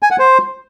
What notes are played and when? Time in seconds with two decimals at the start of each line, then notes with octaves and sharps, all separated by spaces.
0.02 G#5
0.11 F#5
0.19 C5